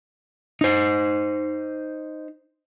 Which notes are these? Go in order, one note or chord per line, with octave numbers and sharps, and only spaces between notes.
D#4 C5